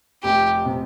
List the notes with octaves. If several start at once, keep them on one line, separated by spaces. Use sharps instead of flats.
F1 G4
C3